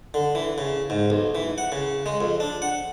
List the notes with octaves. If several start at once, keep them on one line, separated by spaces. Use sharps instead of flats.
D3
E3
C#3
G#2
B1
E3
F#5
C#3
G#3
F2
D4
F#5